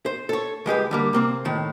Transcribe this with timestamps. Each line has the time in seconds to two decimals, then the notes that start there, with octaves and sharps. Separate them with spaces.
0.06 C5
0.29 A4 C#5
0.66 C#2 G#3 G4 B4
0.91 D3 G3 A#3
1.13 C3 A#3 C4
1.45 A2 D#3